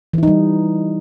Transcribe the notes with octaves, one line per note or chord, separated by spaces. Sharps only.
E3 G3 D#4 E4